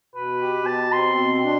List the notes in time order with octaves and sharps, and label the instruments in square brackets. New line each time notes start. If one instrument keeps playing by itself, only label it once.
[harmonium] B2 [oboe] B4
[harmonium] G4
[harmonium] B2 [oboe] A5
[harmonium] C4 [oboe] C6
[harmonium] B2
D4